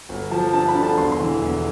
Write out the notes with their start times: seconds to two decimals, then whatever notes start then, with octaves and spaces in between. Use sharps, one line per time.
0.09 G1
0.31 F3 A5
0.53 G2 A5
0.68 B5
0.75 D3
0.83 A5
0.97 E1 C6
1.12 C6
1.20 E3
1.42 E2